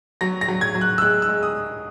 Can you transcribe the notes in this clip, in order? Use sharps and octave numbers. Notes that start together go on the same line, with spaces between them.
F#3 A#6
A#6
F#3
G#6
F#3
F#6
E6
G#3 F#6
E6
G#3
D#6